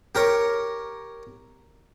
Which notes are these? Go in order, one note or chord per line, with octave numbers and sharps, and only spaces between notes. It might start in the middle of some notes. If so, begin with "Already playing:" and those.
G4 A#4 C#5